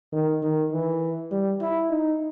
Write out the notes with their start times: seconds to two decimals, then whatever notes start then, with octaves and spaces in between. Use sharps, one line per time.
0.13 D#3
0.42 D#3
0.72 E3
1.31 G3
1.61 E4
1.90 D#4